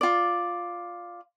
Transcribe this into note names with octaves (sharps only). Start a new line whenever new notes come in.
F4 D5